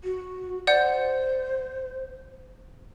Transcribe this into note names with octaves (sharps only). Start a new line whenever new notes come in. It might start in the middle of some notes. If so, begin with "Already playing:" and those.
F#4
C5 D5 F#5 G6